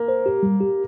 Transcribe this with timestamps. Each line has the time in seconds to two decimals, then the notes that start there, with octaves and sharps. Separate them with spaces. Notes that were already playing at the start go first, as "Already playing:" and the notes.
Already playing: A#3
0.08 C5
0.26 G4
0.43 G3
0.61 G4